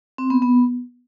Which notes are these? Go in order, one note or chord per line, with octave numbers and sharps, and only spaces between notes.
C4
B3
B3